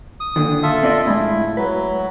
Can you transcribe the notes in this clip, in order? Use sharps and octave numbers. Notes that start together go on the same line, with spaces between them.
D#6
A#2 D3 D#3
F4 A4 E5
C4 D5 D#5
A2 G#3 E4
F#3 B4